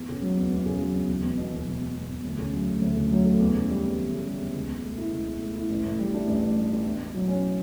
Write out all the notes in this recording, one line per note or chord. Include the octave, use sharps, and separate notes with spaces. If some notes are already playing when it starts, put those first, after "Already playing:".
Already playing: E2
C#3
F#3
E2
E2
C#3
F#3
E2
E1
E2
B2
E1
E1
E2
B2
E1
D2
C#3
F#3
A3
D2
C#3
F#3
A3
E2
C#3
G3
E2
E2
C#3
G3
E2
C#2
B2
A3
E4
C#2
B2
A3
E4
A1
A2
G3
D4
A1
A2
G3
D4
E2
B2
F#3
C#4